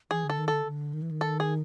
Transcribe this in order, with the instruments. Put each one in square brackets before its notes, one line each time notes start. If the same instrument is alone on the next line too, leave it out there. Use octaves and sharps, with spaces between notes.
[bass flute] E3 [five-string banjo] G#4
[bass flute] D3
[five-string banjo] A4
[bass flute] D#3
[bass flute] D3 [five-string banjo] A4
[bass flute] D3
D#3
E3
D#3
[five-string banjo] A4
G#4